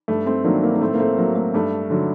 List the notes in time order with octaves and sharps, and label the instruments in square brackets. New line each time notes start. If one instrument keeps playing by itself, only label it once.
[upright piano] G2 A3
A3 C4
D#3 F#3 A#3 D4
A#3
A#3
A2 A3 C4
A#3
A3 C4
F#3 A#3
A3
G2 A3
D3 F#3